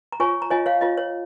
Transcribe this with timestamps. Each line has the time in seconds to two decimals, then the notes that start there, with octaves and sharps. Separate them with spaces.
0.12 A#5
0.20 F4 C#5 G#5 C#6
0.42 A#5
0.50 F4 C#5 D#5 G#5
0.66 C#5 F5
0.81 F4 C#5 D#5
0.98 C#5